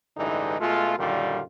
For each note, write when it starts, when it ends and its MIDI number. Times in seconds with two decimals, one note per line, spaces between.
0.17 0.57 33
0.17 0.57 43
0.17 0.57 50
0.17 0.57 52
0.17 0.57 56
0.17 0.57 63
0.60 0.95 47
0.60 0.95 56
0.60 0.95 57
0.60 0.95 65
0.98 1.41 42
0.98 1.41 46
0.98 1.41 50
0.98 1.41 51
0.98 1.41 55
0.98 1.41 65